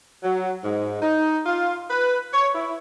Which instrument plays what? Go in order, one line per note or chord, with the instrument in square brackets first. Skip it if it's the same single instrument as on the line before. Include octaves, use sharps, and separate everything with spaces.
[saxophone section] F#3
G#2
D#4
F4
B4
C#5
E4